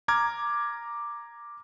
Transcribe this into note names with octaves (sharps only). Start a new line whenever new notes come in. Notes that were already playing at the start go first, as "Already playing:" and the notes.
A#5 D6 F6 G#6